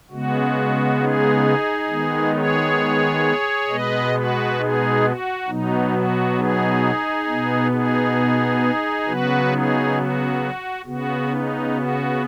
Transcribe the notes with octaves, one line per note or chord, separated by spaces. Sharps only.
C#3 G#3 B3 F#4
D#4 G#4
D#3 G#3 B3
G#4 C#5
B2 G#3 B3 B4 D#5
F#4 B4
D#4 G#4
F#4
B2 F#3 B3 D#4
F#4
D#4 G#4
B2 B3
D#4 G#4
C#3 F#3 B3 F#4 B4
D#4 G#4
F#4
C#3 B3 F#4
D#4
F#4